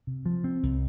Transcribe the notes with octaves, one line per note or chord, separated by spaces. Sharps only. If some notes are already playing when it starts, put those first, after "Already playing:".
C3
F3
C4
C2